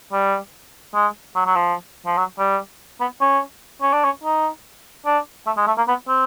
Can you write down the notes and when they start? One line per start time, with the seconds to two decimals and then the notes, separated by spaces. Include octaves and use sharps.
0.12 G3
0.95 G#3
1.36 F#3
1.46 F#3
1.56 F3
2.06 F3
2.18 F#3
2.38 G3
3.00 B3
3.21 C#4
3.82 C#4
3.93 D4
4.04 C#4
4.23 D#4
5.06 D4
5.47 A3
5.57 G#3
5.67 A3
5.78 A#3
5.88 B3
6.08 C4